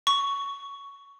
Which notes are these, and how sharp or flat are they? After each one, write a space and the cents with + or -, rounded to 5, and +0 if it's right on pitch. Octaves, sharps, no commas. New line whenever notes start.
C#6 +10